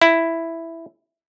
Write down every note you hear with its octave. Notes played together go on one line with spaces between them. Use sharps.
E4